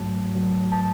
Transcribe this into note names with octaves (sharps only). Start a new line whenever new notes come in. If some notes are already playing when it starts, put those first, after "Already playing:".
Already playing: G#2 F#3 A3 A5
F#3
A5